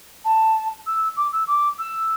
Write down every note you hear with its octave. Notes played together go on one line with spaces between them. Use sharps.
A5
E6
D6
E6
D6
E6